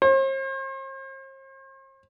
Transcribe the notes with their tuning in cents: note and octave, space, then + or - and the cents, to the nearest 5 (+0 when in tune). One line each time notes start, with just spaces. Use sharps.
C5 +45